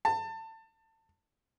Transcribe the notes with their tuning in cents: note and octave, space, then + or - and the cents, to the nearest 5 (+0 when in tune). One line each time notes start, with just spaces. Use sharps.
A5 +25